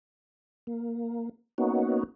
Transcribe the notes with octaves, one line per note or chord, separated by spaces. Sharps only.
A#3
A#3 B3 C#4 D#4 F#4